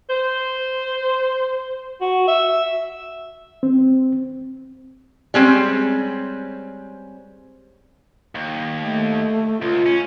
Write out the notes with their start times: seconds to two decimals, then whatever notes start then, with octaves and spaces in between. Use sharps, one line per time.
0.10 C5
2.01 F#4
2.28 E5
3.63 C4
5.34 G3 G#3 C4 C#4
8.35 D#2
8.80 A3
9.62 C#2 F4
9.86 C#4